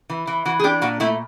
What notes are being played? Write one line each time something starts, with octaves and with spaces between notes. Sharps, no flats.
E3
E3
E3 F#4
G#4
D4 G4
A#2 F#4
A3 E4